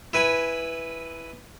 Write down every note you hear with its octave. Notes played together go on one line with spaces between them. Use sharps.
E4 B4 G#5 B5